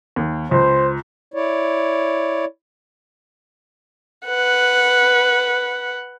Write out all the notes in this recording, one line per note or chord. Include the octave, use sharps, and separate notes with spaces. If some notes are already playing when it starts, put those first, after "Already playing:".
D#2
C#2 C5
E4 C#5 D5
B4 F#5